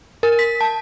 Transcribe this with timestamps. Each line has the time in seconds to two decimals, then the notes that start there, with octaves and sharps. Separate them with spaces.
0.23 A#4
0.39 B6
0.61 A5